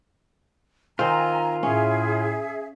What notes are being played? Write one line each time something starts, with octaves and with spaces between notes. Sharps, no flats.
D#3 C4 F4 C5 G#5 A#5
A2 C#4 G#4 E5